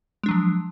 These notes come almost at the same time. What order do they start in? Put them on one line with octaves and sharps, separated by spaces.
G#3 D4 F#3 F3